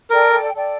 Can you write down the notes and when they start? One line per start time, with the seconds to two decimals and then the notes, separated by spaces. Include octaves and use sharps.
0.10 A4 A#4 D5 G5
0.54 A4 D5 G5